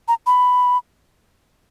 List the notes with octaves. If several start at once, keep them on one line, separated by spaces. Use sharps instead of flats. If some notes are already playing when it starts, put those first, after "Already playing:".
A#5
B5